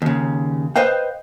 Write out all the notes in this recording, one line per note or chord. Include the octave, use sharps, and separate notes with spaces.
D#2 C#3
B4 C5 D#5 F5 G5